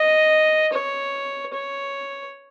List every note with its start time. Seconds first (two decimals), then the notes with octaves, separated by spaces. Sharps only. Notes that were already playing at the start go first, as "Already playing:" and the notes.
Already playing: D#5
0.73 C#5
1.53 C#5